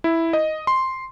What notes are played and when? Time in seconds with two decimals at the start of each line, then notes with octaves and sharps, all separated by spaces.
0.04 E4
0.33 D#5
0.67 C6